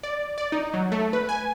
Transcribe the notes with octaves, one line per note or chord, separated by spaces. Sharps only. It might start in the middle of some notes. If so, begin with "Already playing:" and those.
D5
D5
D#4
F#3
A3
B4
G#5